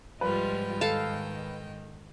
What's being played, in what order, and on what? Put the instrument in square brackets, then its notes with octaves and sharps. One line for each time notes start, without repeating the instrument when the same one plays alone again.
[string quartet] G#2 D#5 G5 [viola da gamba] F3 G3 F4 [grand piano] B4
[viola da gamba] D#3 [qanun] A4 F5 A5